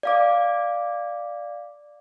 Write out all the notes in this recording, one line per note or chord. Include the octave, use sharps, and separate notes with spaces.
D5 F5 D6